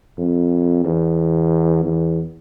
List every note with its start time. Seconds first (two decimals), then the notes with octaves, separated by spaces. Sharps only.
0.18 F2
0.85 E2
1.85 E2